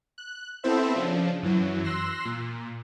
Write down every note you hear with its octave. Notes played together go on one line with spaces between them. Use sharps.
F#6
B3 C4 E4 A4 C5 E5
C#3 F3 D4
F#2 E3 F#3
C6 E6 F#6 A#6 C7
A#2